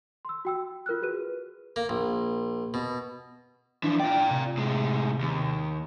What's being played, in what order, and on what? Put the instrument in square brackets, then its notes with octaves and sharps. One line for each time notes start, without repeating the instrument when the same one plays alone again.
[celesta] C6 E6
F#4 G5 E6
F4 A#4 F6 F#6
F#4 G#4 B4 D#7
[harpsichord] A#3
A#1
B2
[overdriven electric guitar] E3 F3 [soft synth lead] D4
[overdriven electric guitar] F4 D5 [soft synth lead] G5
[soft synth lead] C3
[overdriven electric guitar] A2 G#3
D#2